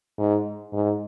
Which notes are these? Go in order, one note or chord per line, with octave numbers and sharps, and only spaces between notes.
G#2
G#2